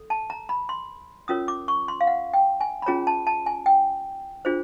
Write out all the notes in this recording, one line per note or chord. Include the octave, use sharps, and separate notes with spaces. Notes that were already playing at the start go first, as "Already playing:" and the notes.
Already playing: A4
A5
A#5
B5
C6
C#4 F4 A#4 C#5 D#6
D6
C#6
C6
F5
F#5
G5
G#5
B5
C#4 F4 G#4 C#5 A#5
A5
A5
G#5
G5
D4 F4 G#4 C5